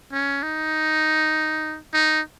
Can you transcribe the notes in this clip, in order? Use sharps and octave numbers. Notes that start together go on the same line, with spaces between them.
C#4
D#4
D#4